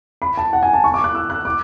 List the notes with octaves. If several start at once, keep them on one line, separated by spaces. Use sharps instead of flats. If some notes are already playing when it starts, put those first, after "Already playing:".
B5
A5
F#5
G#5
A5
C#6
D6
F#6
E6
F#6
D6